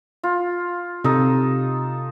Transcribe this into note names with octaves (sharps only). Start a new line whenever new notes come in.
F4
C3 D#4 A4 D#5